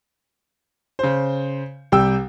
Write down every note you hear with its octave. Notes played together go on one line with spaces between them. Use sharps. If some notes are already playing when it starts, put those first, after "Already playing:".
C#3 C5
C2 G3 G5 E6